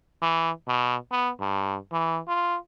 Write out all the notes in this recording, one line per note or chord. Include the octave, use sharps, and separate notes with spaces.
E3
B2
B3
G2
E3
F4